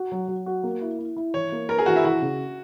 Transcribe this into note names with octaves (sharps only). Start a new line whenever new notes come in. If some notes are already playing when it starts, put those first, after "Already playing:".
Already playing: F#4
F#3
F#3
F#4
A#3
E4
E4
E4
E3 C#5
A#3
A#4 B4
G#4
E3 F#4
E4
E3 F#4
C#3